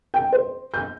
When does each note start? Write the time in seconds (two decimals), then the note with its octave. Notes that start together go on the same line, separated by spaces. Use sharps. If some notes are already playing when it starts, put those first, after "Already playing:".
0.14 G5
0.32 C5
0.74 G6